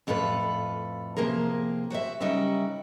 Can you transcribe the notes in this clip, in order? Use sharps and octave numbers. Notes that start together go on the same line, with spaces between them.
F2 A2 F4 A4 B4
C3 E3 F3 A#3 G#4 A#4
F#4 C5 D5 E5
C#3 G3 D#4 F#4 A#4 E5